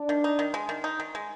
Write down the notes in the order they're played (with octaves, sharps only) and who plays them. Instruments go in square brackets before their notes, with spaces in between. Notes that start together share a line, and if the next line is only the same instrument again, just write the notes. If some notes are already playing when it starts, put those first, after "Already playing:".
Already playing: [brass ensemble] D4
[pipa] D#3
D#4
D#3
G#3
D#3
D#4
D#3
G#3